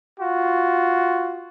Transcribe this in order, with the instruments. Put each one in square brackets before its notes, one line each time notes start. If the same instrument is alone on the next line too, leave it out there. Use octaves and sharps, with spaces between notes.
[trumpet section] F4 F#4